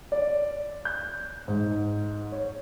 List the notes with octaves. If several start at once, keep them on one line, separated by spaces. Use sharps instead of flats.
D5
G6
G#2
C#5